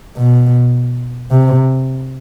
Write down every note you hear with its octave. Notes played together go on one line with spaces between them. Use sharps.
B2
C3